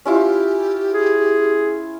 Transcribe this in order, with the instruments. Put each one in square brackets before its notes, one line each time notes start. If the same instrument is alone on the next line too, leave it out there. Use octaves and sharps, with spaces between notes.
[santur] C#4 E4 F4 [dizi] G4
[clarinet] G#4